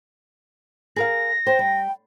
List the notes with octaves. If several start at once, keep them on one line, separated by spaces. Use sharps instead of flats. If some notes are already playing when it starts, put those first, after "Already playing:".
G#4 A#4 F5 A#6
C5 G5
G3